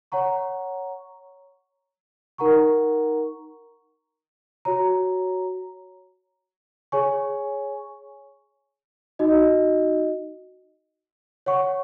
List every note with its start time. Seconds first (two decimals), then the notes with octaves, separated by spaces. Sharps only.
0.12 C#5 F#5 A#5 C#6
2.38 D#4 A#4 F#5 A#5 C#6
4.65 F#4 C#5 A#5
6.92 G#4 C#5 G#5 C#6
9.19 D#4 F#4 D#5
11.46 C#5 F#5 C#6